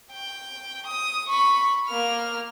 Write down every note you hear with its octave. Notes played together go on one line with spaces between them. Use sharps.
G5
D#6
B5 C#6
A#3 F6